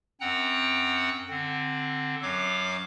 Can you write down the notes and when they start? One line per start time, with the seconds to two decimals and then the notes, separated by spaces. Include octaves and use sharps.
0.21 F#2 C4 F#5 G5 A#5 F#6
1.29 D3 C4
2.22 F#2 F#3 C#5 F5 D6